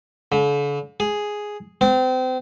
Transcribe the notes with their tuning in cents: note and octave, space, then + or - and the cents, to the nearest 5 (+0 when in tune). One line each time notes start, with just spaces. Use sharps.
D3 -40
G#4 +0
C4 -30